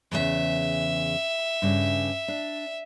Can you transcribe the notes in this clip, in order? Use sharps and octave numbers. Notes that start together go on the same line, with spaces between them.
E2 A#2 C#3 E5
G2 C#3
D4